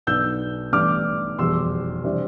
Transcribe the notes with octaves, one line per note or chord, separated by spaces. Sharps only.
B1 B2 B3 D4 E6 G6
A1 A2 G3 B3 D4 D6 F6
F1 E2 B2 G3 C6 E6
C3 E3 G3 D4